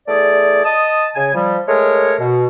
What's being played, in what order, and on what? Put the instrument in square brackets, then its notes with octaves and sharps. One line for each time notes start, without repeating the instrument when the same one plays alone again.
[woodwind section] E2 A3 G#4 D5
D#5 A5 D#6
C#3 G#5
F3 G3
G#3 A3 A#4 C#5
B2